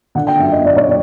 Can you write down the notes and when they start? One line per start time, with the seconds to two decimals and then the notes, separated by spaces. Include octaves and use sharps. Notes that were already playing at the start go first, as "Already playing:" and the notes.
0.15 D3 F#5
0.27 G5
0.39 F#2 E5
0.52 D#5
0.64 F#2 D5
0.76 C#5
0.87 D5